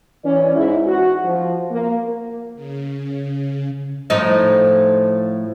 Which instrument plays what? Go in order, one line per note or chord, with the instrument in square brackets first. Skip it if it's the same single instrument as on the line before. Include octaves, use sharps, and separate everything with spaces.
[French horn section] E3 C#4 D5
G#2 E4
F#4
F3
A#3
[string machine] C#3
[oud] A2 F3 D#4